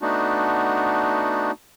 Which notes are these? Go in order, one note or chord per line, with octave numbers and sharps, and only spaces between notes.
A3 B3 D4 D#4 F#4